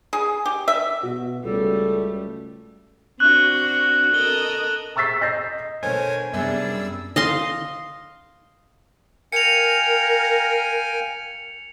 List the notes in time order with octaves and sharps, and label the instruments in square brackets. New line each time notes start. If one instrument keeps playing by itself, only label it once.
[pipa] G#4
G4
E5
[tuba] B2 [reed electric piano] F#4
[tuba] C#2 [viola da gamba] G3 A3 [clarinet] A4
[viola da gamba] C4 D4 F#4 [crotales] C#6 F#6 F#7
[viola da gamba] A4 A#4 D#5 [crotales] G7
[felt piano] A#5 C#6 E6 A6 B6 C7
D#5 E6 G6 A6 A#6 C7
[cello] B2 [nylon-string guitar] D3 A3 [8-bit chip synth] A#4 C5 C#5 [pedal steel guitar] G#5
[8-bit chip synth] F#2 G3 E6 [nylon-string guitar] C3 B3 E5 [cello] D4 G#4
[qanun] D#5 F5 C6
[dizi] A#4 [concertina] F5 G5 G#5 [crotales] C#7 F7